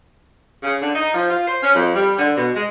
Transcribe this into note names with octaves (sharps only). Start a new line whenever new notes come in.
C#3
D3
D#4
F3
F4
C5
C#4
F2
G3
D3
B2
G#3